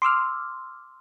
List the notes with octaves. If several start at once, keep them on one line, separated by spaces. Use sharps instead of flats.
C6 D6 E6 F6